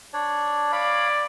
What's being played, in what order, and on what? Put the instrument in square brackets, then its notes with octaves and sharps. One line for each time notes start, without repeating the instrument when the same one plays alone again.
[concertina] D4 C#5 D5
[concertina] C#5 F5 B5 [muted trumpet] D5